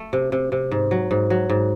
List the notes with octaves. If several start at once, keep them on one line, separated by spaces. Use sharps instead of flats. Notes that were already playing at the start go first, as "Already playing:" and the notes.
Already playing: A3
C3
C3
C3
G#2
F#3
G#2
F#3
G#2